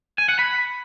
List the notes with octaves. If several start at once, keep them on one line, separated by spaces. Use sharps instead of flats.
G#5
F#5
B5